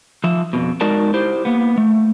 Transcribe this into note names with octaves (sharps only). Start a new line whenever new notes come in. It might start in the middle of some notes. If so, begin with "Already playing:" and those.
F3 E5
F2 B2
G#3 D#4 F#4 A#4 D5 A5
E4 G4 C5
A#3 B3
A3